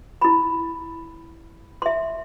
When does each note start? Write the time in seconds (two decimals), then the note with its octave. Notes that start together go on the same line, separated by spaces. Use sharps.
0.22 E4 B5
1.82 E5 C6